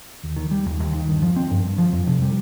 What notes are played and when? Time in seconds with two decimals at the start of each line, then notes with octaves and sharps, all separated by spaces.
0.24 D#2
0.36 D#3
0.51 G3
0.66 D#2
0.80 D#2
0.94 D#3
1.08 G2
1.22 F3
1.36 C4
1.51 G2
1.64 G2
1.78 F3
1.93 F2
2.07 C3
2.21 G3